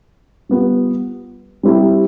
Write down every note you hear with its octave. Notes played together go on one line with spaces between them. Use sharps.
G3 B3 F4
G3 C4 E4 G4